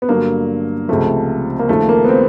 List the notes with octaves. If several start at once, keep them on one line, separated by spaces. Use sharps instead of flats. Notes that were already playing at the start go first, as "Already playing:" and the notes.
B3
G2 D3 F#3 A#3
C#2 C3 F3 A3
A#3
D#2 C#3 F3 A3
A#3
B3
C4